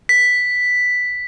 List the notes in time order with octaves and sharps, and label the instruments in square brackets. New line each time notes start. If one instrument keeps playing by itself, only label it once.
[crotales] B6